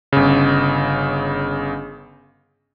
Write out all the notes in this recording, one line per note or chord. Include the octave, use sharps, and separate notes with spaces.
G1 C#3